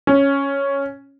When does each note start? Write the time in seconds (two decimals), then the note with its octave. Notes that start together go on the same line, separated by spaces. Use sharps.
0.07 C#4